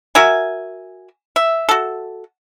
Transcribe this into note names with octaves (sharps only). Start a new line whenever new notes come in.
F#4 A#4 E5 G#5
E5
F#4 A4